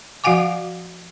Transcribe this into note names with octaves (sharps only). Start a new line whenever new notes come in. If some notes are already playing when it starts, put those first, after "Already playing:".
F3 F#4 F5 F#5 G#5 D6